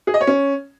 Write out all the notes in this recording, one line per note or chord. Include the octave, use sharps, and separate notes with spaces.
G#4
D#5
C#5
C#4